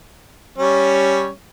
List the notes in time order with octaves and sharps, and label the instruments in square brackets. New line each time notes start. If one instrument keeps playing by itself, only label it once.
[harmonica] G3 C#4 C#5